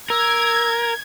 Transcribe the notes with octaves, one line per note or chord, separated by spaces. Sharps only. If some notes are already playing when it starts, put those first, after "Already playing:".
A#4 E6 G#6